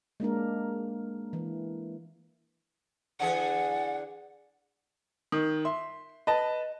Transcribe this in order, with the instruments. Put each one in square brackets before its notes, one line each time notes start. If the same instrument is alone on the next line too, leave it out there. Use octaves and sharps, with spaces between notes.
[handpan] G#3 A#3 D4 A#4
E3
[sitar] D3 E3 G#4 [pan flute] F#5
[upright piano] D#3
[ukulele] E5 [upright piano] C6
[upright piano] B4 A5 [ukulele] D#5